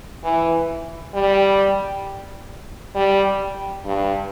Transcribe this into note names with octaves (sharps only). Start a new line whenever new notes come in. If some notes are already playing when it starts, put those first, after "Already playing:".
E3
G3
G3
G2